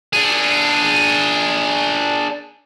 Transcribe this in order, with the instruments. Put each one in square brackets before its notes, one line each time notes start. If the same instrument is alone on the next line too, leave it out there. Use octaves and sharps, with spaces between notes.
[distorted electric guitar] D4 G#4